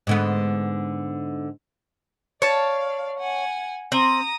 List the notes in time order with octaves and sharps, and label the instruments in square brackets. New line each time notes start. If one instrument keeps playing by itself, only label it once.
[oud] G#2 D3 B3
[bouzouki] C#5 A5 [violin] D5 F5
[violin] F#5 G#5
[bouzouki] C4 [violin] A#5 D#6